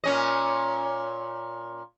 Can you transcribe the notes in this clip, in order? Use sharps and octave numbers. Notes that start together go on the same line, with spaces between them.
A#2 C#4 D#5